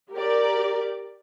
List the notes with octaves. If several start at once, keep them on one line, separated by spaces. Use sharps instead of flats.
G4 A#4 D5